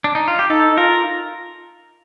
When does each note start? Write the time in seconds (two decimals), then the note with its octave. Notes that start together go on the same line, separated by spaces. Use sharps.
0.04 D4
0.15 D#4
0.28 F4
0.39 G4
0.50 D#4 A4
0.72 D#4
0.77 F4 A#4